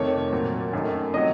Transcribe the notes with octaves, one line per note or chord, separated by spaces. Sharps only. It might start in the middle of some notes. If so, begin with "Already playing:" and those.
Already playing: F2 C3 D#3 A3 C#5
A#2 F#3 C4
F#2 D#3 A3
C3 D#3 F#3 D#5